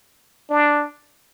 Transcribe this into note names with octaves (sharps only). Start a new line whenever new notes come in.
D4